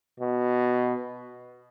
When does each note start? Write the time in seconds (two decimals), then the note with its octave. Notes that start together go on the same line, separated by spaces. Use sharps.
0.20 B2